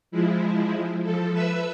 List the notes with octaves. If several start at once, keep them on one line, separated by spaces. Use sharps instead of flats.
F3 G#3 E4
F3 A4
B4 E5 E6